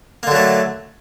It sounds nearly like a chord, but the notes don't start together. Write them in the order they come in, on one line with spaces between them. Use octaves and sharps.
A#3 D3 F#3 A3